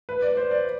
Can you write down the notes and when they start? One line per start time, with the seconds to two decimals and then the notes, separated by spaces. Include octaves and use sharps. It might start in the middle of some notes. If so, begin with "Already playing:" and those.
0.09 B4
0.22 D5
0.37 C5
0.51 D5